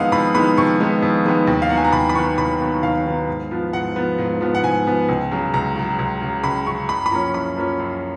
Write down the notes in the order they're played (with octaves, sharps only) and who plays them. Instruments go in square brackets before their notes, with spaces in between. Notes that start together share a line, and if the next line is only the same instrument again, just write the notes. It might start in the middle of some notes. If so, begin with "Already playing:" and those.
Already playing: [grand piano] F2 D#3 G#3 B3 D#5 F5 F#5
F2 B5
D#3 G#3 B3 B5
F2 C#6
D#3 G#3 B3
F2
D#3 G#3 B3
D#2
F5
D#3 F#3 B3 F#5
G#5
A#5
D#2 B5
B5
D#3 F#3 B3 C#6
D#2 B5
D#3 F#3 B3
D#2 F5
D#3 F#3 B3
G#2
F3 B3
G#2 F#5
F3 B3
G#2
F3 B3
F#5
G#2 G#5
F3 B3
C#2
C#3 F#3
C#2 A#5
C#3 F#3
C#2
C#3 F#3
C#2 B5
C#3 F#3 C#6
F#2 B5
B5
F3 A#3 C#4 A#5
F#2 B5
F3 A#3 C#4
F#2